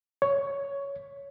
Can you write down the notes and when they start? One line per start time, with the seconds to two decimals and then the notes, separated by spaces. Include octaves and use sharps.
0.22 C#5